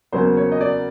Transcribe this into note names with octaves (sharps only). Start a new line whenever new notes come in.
E2 C#3 F#3 A#3 C5
C#5
D#5
D5